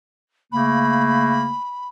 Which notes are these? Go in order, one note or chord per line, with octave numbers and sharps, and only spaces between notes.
C#3 A3 A#3 B5